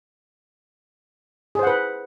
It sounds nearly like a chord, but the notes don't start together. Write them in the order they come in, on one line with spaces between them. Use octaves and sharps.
G#4 C5 F#5 B4